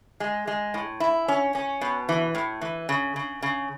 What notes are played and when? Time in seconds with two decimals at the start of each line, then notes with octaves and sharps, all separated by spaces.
0.20 G#3
0.47 G#3
0.74 A2
1.00 E4
1.28 C#4
1.55 C#4
1.81 B2
2.09 E3
2.35 A2
2.61 E3
2.89 C#3
3.16 C#3
3.42 C#3